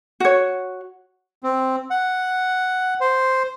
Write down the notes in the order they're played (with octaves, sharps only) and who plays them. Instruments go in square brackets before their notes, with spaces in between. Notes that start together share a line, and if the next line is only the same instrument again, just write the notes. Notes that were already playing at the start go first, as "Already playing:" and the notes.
[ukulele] F#4 C#5
[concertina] C4
F#5
C5